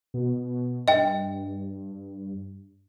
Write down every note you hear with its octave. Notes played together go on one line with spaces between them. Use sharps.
B2
G2 D#5 G5